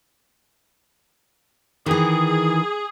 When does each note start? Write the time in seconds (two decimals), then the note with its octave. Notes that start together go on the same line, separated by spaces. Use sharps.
1.86 D#3 E3 G#4